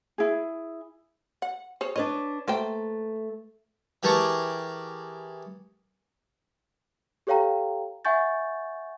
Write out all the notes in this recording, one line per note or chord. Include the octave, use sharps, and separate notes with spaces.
E4 G#4
F#5
G#4 C5 C#5
D4 B4 C#5 D#5
A3 A#3 C5 G5
E3 G4 G#4 A#4 A5 C#6
G4 A4 C#5 F5 G5 A#5
E5 F#5 G#5 C#6 G6 A6